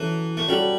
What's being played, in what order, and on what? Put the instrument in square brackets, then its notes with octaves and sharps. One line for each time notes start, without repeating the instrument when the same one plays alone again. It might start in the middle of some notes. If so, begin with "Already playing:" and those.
Already playing: [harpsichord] E3 [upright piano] F#3 C#4 F#4 A4
[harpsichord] A3
[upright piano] F#3 C#4 F#4 A4 [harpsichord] G3